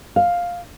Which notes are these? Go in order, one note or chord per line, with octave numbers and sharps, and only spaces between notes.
F5